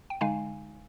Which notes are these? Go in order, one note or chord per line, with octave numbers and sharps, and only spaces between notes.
G5
D3 G#3 D#4 F5 G#5